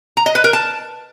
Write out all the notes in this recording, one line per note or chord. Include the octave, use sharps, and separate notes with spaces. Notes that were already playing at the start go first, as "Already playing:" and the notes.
A#5
D#5
B4
A#4
A5